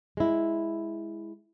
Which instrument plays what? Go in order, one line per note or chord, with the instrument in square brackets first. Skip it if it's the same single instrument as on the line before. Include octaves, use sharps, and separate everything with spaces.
[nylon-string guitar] G#3 E4